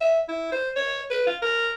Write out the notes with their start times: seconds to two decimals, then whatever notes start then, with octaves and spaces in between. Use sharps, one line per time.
0.01 E5
0.28 E4
0.52 C5
0.76 C#5
1.10 B4
1.26 F4
1.42 A#4